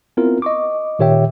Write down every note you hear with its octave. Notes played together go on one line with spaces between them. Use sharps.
B3 C4 E4 F4 A#4
D#5 C#6 D6
A#2 D#3 G4 C#5 E5 G5